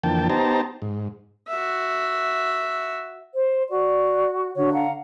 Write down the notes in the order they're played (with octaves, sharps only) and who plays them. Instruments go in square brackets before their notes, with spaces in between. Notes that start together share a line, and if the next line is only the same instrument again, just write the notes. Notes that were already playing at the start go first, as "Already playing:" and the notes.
[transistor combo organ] F2 D3 E3 A#3 G5 A5
B3 D#4 G4 C5 A5 A#5
G#2
[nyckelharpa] F#4 E5
[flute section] C5
[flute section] F#4 [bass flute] D5
[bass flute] D3 [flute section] F#4 C#5
[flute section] F5 F#5 A#5